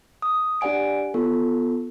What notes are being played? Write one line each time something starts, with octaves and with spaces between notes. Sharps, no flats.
D#6
D4 G4 D5 F#5 G#5 D7
B3 F4 A4